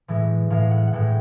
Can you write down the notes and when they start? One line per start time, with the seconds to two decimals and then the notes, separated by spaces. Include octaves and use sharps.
0.08 A2 E3 G#3
0.50 A2 E3 G#3 F5
0.71 F#5
0.87 F#5
0.93 A2 E3 G#3 G5